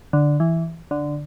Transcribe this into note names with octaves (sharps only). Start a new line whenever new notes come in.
D3
E3
D3